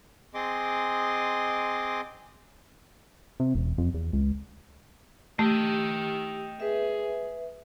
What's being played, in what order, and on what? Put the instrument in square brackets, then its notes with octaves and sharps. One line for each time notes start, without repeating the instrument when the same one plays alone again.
[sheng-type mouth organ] C4 G#4 D#5 C6 D6
[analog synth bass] C3
E1
F2
E2
C#2
[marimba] A3 [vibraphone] G4 E6 [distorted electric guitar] D#5 G5
[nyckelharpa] G#4 [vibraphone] B4 E5